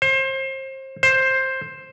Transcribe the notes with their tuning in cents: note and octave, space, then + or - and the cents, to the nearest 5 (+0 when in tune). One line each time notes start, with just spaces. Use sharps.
C5 +30
C5 +10